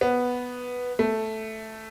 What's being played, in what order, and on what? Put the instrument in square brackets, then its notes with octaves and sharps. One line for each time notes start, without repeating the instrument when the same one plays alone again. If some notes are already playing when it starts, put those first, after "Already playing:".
[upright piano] B3
A3